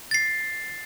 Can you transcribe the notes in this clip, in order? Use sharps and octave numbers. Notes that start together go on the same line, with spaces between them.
A6 C7